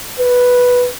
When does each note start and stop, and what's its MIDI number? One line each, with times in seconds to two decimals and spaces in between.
0.19 0.89 71